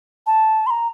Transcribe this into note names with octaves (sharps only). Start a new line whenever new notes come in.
A5
C6
A#5